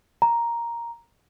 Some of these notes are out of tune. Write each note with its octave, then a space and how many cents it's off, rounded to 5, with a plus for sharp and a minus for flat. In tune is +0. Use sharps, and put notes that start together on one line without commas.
A#5 +5